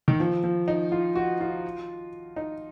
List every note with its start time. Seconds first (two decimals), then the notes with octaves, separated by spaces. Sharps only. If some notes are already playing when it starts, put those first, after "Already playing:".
0.08 D#3
0.20 F3
0.44 F3
0.68 D#4
0.92 F4
1.15 F#4
1.41 F4
2.36 D#4